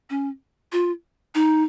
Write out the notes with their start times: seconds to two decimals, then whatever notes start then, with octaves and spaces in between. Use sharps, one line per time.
0.10 C#4
0.73 F4
1.35 D#4